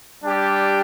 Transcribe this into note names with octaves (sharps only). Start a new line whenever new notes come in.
G3 D4 G4